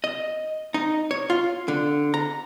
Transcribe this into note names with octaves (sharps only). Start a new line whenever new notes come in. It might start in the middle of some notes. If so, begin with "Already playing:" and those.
D#5
D#4
C#5
F4
D3
A#5